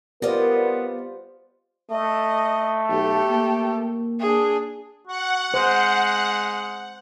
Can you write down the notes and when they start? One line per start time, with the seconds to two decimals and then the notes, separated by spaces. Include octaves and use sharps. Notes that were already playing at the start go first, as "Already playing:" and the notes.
0.22 B3 F4 G4 A#4 C5 D5 D#5
1.91 A3 D#5
2.89 B1 G4 A4
3.31 A#3
4.20 D4 G#4
5.08 F#4 F#5
5.54 G#3 C5